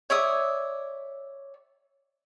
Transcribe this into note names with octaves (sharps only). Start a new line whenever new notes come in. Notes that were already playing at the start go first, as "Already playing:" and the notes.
C#5 D5 E5 D#6